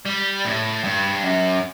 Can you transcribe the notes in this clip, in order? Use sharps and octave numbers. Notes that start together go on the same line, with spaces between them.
G3
A2
G2
F#2